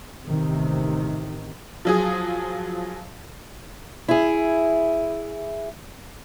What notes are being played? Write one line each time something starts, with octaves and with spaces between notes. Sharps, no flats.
A1 C3 D#3
F3 F#3 G#4
E4 G#4